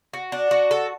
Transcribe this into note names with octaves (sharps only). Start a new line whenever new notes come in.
F#4
D4
F#4
A4